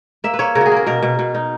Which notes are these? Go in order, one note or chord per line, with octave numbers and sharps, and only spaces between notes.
A#3 E5
B4
A#3 C#5
C#3 A#4
F#4 G#4
A#3 A#4
B2 A#4
B2
B2
D#4